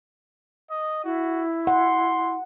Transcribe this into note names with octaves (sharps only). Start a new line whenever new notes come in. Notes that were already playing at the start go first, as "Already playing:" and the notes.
D#5
E4 F#4
F#5 C6